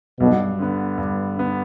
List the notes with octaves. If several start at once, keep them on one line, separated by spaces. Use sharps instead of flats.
B1 G2 B2
D3 B3
G2
D3 B3